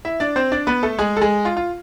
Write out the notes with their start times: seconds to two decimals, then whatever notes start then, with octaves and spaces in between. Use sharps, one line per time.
0.05 E4 E5
0.20 D4 D5
0.36 C4 C5
0.52 D4 D5
0.67 B3 B4
0.83 A3 A4
0.98 G#3 G#4
1.17 A4
1.21 G#3 G#4
1.45 F4
1.57 F4